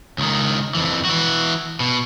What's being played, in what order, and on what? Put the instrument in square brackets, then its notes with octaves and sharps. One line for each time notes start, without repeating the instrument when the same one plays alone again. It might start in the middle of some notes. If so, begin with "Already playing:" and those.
[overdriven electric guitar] C#2 D#3
F2 E3
E3 F#4
B2